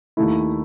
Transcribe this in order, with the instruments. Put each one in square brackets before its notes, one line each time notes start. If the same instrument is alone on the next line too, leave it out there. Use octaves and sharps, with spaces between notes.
[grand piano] D#2 D#3 A3 E4